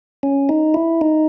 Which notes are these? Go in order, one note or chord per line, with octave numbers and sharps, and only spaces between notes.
C#4
D#4
E4
D#4